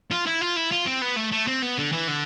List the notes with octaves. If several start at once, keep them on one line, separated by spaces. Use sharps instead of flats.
F4
E4
F4
E4
F4
C4
B3
A3
A3
C4
B3
D3
E3
D3